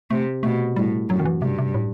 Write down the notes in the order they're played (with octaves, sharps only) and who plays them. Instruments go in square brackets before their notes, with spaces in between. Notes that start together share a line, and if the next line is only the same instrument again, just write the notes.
[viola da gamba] C3 [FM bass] A3
[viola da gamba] B2 [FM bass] A3
[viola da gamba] A2 [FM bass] G3
[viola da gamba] F#2 [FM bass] F#3
[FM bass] D#3
E3
[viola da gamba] G2 [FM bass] C3
[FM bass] C3
A2